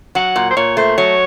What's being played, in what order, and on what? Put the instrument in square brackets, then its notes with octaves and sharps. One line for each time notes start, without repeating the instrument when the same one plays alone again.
[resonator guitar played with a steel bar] F#3 [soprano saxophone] F#5
[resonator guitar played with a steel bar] A#2
[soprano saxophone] C5
[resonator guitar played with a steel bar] A#2 [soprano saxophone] C#5
[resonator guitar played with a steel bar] A3 [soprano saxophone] C5
[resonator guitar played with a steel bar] F#3 [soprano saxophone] C#5